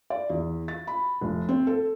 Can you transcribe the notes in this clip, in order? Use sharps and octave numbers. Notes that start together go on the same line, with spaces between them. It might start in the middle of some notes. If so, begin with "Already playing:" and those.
D5
E2
A6
B5
F1
C4
A4